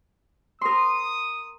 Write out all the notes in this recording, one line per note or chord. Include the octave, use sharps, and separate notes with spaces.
A#4 C6 D#6